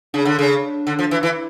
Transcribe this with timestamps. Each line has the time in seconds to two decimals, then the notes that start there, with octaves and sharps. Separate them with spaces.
0.14 C#3 D4
0.25 D3
0.39 C#3
0.87 D3
0.99 F3
1.11 E3
1.23 E3 E4